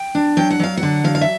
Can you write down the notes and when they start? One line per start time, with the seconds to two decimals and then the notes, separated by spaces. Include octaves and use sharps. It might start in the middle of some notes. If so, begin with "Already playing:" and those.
Already playing: G5
0.15 D4
0.37 F#3 G5
0.50 F#5
0.60 F#3 F5
0.77 F#5
0.83 D3
1.04 F#3 F5
1.15 F5
1.21 E5